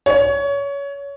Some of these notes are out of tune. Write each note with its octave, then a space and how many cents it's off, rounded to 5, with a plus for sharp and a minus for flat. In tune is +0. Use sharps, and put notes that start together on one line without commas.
C#5 +20